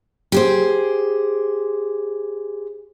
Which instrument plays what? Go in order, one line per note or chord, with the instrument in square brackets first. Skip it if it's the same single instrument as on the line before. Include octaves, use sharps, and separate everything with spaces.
[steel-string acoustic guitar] G4 G#4 C5